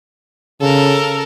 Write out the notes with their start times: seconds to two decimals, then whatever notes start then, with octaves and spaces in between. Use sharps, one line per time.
0.61 C#3 A4 A#4